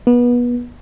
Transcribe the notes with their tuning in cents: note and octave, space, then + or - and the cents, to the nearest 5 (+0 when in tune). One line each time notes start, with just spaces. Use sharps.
B3 -25